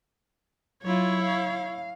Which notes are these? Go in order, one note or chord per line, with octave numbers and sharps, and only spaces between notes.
F#3 E4 F4 C#5
F5